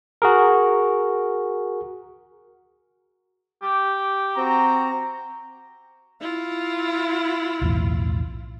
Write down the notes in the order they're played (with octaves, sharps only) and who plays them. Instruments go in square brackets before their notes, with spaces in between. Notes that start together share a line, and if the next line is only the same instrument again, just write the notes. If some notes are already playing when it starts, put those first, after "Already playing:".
[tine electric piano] F#4 G#4 A#4
[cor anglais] G4
[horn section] C4 F#4 A#5
[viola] E4 F4
[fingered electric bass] B1 E2 A2